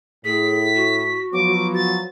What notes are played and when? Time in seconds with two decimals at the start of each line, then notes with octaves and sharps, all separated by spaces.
0.24 A2 G#4 B6
0.75 F#4
1.33 F3 F#3 B3 D6
1.74 A6